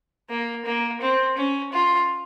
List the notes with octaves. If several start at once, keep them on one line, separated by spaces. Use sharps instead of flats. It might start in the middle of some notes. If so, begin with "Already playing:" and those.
A#3
A#3
C4
C#4
F4